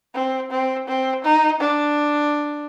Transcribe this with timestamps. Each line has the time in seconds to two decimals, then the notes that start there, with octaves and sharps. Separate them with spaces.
0.15 C4
0.51 C4
0.88 C4
1.24 D#4
1.60 D4